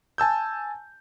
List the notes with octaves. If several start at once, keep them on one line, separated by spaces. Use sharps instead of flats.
G#5 A5 E6 G6